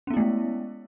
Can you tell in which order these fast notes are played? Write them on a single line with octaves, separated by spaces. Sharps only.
C#4 B3 E4 A3 G#3